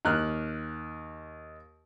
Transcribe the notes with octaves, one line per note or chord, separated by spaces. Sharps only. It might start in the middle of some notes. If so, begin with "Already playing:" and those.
D#2 F6 F#6